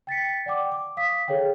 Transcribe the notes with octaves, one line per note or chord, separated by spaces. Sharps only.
G5 A6 B6 C#7
D5 F#5 G5 D6
D6
F5 D#6 B6
G#4 A4 C#5 F5 G5